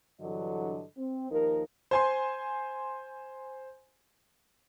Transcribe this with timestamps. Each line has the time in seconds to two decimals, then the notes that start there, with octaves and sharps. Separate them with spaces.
0.21 G2 D3 E3 F#3 A4 D#5
0.98 C4
1.31 D#2 F3 D#4 A#4
1.91 C5 G#5 C6